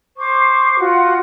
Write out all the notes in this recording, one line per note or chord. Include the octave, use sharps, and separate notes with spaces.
C5 C#6 D6
F4 F#4 F#5